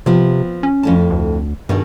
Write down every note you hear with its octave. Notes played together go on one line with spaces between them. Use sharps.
C3 F3 B3 C4
C#4
F2 A2 A5
D2
G2 B2 D#3 G#4